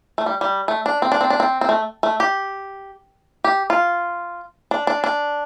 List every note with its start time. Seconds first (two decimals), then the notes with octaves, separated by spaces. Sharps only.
0.18 A3
0.26 G3
0.41 G3
0.68 A3
0.86 D4
1.02 C4
1.12 D4
1.21 C4
1.30 D4
1.40 C4
1.61 C4
1.69 A3
2.03 A3
2.20 G4
3.44 G4
3.70 F4
4.71 D4
4.87 D4
5.04 D4